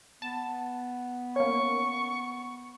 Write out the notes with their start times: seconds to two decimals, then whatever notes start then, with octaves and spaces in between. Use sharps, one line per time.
0.22 B3 A5
1.36 A#3 C#4 C#6